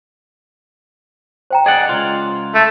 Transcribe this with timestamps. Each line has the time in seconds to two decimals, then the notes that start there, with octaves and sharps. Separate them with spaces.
1.50 C5 G5 A#5
1.66 G#4 D5 D#5 F#5
1.89 C#2 F4
2.54 A3